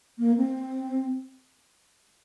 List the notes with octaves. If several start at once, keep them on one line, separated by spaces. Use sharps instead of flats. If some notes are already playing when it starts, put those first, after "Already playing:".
A#3
C4